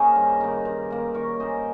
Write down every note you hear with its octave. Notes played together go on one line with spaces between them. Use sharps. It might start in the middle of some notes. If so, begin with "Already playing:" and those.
Already playing: A#3 C#4 G#4 A#4 C5 D#5
G2
D#3 A#3
G2
D#3 A#3
D#3 A#4 C#5
A#3 C#4 C5 D#5